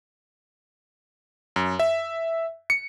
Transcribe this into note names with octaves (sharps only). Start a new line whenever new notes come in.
F#2
E5
C#7